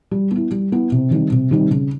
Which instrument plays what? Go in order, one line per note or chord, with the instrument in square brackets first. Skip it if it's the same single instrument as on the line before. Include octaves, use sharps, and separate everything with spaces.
[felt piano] G3
B3 E4
G3
B3 E4
C3
D#3 G3 C4 D#4
C3
D#3 G3 C4 D#4
C#3